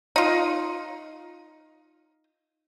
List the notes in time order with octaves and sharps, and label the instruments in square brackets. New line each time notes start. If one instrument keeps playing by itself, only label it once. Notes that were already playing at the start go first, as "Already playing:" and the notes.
[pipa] D#4 F4